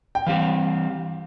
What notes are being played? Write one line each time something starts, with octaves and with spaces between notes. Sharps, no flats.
G5
E3 G3 C4 G4 F5